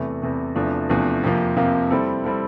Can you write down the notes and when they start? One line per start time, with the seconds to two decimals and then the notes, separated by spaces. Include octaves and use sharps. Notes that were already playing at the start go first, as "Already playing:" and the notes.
Already playing: E2 C3 E3 A3
0.22 E2 C3 E3 A3
0.55 E2 C3 F3 A3 D4
0.89 E2 C3 F3 A3 D4
1.23 F2 C3 F3 A#3
1.56 F2 C3 F3 A#3
1.90 G3 C4 E4 A4
2.24 G3 C4 E4 A4